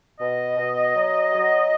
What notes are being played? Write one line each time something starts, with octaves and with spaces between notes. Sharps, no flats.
B2 D#5
B2
F#3
F#3